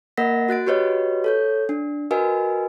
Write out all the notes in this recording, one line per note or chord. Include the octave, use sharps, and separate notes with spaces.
A#3 A#4 D#5 F#5 A#6 B6
F#4 F#6 A6 D7
F#4 G4 B4 C#5 D#5
A4 C#5 G6
D4
F#4 A#4 B4 D#5 G#5